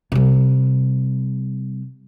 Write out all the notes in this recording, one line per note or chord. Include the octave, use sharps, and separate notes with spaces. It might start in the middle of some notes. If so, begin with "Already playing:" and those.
C3 G3